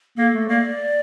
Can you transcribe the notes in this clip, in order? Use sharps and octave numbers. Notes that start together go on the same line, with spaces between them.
A#3 A4
A3
A#3 D5